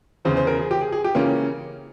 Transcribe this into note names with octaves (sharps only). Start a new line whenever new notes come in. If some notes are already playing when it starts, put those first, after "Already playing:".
E2 C#3 E3 C5
C5
A#4
G#4
G4
G#4
G#4
G4
C#3 E3 A#3 C#4 F4